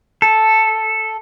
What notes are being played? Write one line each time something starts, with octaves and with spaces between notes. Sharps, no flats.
A4